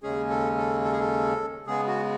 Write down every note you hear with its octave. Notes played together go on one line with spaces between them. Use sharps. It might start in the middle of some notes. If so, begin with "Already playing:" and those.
D#2 C#3 G#3 C#4 G#4
A4
A4
A4
G#4
A4
C#3 G#3 B3 G#4
F#4